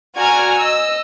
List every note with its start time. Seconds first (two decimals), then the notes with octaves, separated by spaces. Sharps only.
0.17 F#4 D5 G#5 A#5 F6 G#6
0.57 D#5 E6